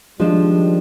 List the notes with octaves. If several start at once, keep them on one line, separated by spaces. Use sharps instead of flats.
D#3 F3 G3 G#3 D4